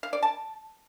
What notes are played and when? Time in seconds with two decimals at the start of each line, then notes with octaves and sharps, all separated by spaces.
0.03 F5
0.13 D5
0.23 A5